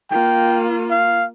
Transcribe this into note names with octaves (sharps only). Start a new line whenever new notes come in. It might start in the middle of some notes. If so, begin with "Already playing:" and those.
A#3 F4 G5
F5